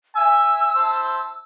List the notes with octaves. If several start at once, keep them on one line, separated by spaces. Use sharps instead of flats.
E5 G#5 E6
E4 C5 A5